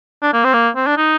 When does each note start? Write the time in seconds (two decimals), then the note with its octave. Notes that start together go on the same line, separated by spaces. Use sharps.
0.22 D4
0.34 A#3
0.44 C4
0.54 A#3
0.76 C4
0.87 D4
0.97 D#4